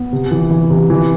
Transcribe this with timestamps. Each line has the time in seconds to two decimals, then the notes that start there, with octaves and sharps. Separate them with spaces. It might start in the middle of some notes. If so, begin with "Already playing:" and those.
Already playing: B3
0.12 C3
0.31 E3
0.51 E3
0.70 C3
0.90 E3